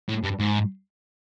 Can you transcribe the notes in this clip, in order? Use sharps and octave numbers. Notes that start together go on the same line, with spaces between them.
A2
G2
G#2